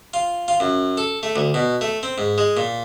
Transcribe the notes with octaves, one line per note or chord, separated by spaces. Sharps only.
F4
F4
F#2
A4
A3
D2
B2
A3
C4
G#2
G#3
A#2